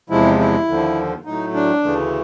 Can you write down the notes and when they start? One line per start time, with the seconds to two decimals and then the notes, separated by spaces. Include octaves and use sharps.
0.09 E2 C3 F3 G#3 E4
0.39 E4
0.68 D#2 D3 F3
1.25 A2 F#3 A3 D#4
1.54 D4
1.83 D2 C#3 E3 A3